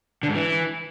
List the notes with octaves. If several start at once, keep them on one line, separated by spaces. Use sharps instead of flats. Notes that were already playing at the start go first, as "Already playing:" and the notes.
D3
G#2
E3